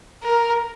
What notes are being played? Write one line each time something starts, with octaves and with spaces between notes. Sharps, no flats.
A#4